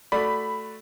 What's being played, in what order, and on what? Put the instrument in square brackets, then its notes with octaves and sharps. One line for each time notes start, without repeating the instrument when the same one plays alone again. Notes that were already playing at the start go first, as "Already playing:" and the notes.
[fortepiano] A3 F#4 D5 [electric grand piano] B5